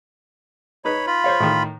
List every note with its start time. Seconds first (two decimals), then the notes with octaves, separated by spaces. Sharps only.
0.85 D#4 B4 C#5 B5
1.07 F4 B5
1.24 C5 C#5 F5
1.40 A2 D#3